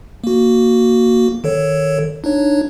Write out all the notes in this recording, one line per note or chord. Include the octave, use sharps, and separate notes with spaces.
A#3 F#4
D#3 A4 C#5
D4 D#4 C#5